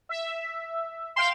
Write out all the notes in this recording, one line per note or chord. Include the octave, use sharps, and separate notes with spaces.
E5
F5 G5 C6 E7